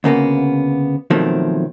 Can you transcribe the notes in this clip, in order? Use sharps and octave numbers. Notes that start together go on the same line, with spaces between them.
D2 C#3 A#3 B3
B2 D#3 F3 F#3 A3 C4